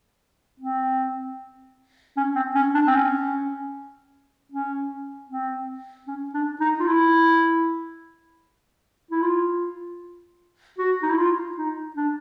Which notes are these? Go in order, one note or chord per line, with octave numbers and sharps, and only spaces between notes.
C4
C#4
C4
C#4
D4
C4
C#4
C#4
C4
C#4
D4
D#4
F4
E4
E4
F4
F#4
D#4
E4
F4
D#4
D4